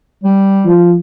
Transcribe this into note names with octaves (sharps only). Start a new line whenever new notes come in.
G3
F3